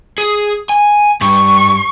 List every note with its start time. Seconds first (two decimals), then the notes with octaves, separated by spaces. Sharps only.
0.18 G#4
0.69 G#5
1.21 G2 C#6